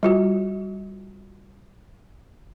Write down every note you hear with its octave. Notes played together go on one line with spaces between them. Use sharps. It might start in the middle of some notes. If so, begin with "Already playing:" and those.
G3 F4 F#4